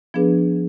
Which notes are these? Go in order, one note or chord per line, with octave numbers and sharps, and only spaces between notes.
F3 B3 D4 G#4 B4